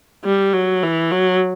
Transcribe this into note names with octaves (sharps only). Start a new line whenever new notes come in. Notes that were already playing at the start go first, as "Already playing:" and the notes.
G3
F#3
E3
F#3